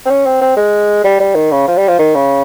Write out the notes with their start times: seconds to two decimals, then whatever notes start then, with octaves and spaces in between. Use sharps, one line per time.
0.06 C4
0.10 C#4
0.26 C4
0.41 C4
0.57 G#3
1.04 G3
1.20 G3
1.35 D#3
1.51 C#3
1.68 F3
1.77 G3
1.88 F3
1.99 D#3
2.15 C#3